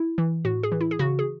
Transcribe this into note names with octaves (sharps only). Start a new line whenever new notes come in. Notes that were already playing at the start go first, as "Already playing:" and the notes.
Already playing: E4
E3
A2 F#4
G#4
E3
E4
G#4
C#3 F#4
G#4